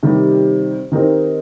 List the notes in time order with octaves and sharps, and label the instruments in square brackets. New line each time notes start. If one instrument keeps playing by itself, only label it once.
[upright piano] C3 D#3 G3
D#3 C4 D#4 G4 A#4